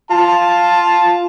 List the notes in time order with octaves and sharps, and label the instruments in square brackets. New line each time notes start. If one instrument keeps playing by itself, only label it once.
[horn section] F4 A5